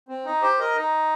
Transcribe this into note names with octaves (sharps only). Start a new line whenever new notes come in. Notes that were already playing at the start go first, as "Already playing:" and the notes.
C4
D#4
G4 C5
A#4 D#5
D#4